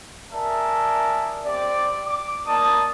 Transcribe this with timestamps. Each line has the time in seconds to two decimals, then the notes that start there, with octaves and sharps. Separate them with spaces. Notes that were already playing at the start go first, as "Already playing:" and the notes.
0.32 G#4 A#4 D5 E5 A5
1.46 C4 G4 D5
2.05 D6
2.47 A#3 D#4 D5 A5 D#6